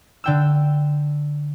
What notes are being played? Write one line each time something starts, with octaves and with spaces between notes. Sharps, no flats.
D3 G5 E6